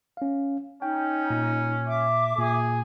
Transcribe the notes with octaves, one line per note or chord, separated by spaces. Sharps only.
C#4 F5
C#4 D#4 G5
A#2
E5 D6
A#2 G#4